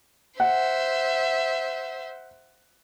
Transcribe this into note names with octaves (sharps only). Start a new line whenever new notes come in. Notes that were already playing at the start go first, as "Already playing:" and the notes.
C5 E5 F#5